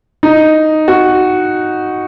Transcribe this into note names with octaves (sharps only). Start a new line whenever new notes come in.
D#4
F#4